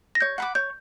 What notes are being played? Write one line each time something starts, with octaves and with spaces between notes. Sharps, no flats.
A#6
C#5 G6
F#5 B5 D6
C#5 G6